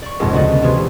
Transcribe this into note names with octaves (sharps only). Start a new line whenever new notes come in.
D5 C#6
F1 A#1 F2 G#2 G#3 A#6
D2 C#3 D4 F#4 D#5 A6
D3 B3 A6
C3 E3 B3 F4 G#4
E1